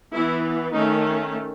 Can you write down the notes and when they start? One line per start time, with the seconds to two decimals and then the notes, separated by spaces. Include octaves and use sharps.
0.13 E3 B3 E4
0.73 D#3 A3 C#4 D#4